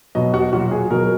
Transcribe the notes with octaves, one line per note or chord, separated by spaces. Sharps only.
B2 F#3 D#5
F#4
A#2 F#3 F#4
G#4
B2 F#3 A#4